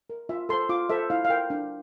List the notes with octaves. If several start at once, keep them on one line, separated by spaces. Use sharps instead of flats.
A#4
F4 E5
A4 C5 C6
F4 D6
A4 C5 E5
E4 F5
F5
A#4 G5
D4